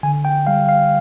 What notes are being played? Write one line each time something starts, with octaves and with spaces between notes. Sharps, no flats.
D3 G#5
G5
G3 F5
F5